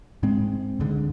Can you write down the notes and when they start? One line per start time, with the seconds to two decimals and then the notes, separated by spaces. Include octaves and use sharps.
0.23 G#2 G#3 C4
0.80 C#2 G#2 D3 G#3